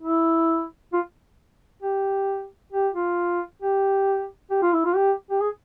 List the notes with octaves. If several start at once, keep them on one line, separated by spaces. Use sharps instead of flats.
E4
F4
G4
G4
F4
G4
G4
F4
E4
F4
G4
G4
G#4